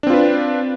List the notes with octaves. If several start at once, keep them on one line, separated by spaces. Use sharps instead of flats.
C4 D4 F4 B4